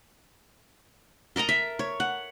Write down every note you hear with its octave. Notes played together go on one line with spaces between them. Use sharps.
A4 A#4 D#5 A#5
E5
C#5
F#5